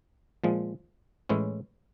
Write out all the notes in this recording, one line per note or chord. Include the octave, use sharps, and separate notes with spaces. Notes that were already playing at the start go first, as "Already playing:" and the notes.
A#2 F3 G#3
A2 E3 G#3 C#4 E4